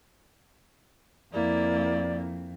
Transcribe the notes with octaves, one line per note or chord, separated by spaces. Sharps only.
F2 A#3 E4 D5